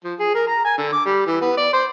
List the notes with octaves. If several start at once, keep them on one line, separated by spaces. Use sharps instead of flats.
F3
G#4
A#4
A#5
G#5
D3
D6
G3
E3
B3
D5
C5